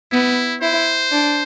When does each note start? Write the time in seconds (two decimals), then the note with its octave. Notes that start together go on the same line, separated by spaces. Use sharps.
0.11 B3 E4
0.61 E4 C5
1.11 D4